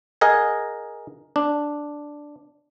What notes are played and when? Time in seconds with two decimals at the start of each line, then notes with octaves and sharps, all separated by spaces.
0.21 G#4 A#4 D#5 F#5 G#5
1.36 D4